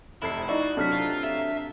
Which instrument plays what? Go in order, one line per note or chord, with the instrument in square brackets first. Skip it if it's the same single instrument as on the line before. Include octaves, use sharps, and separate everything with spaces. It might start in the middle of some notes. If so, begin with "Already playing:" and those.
[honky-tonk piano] F1 F2 C7 [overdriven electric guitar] E4
[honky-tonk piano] D#4 E4 [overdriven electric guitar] F#4 [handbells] D5
[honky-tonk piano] C3 F#3 A3 [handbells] D4 F6 B6
[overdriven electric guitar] F4
E5